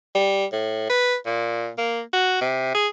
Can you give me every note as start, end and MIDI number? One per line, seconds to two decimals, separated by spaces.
0.15 0.45 55
0.52 0.89 45
0.90 1.16 71
1.26 1.71 46
1.78 2.02 58
2.13 2.36 66
2.41 2.72 48
2.75 2.88 68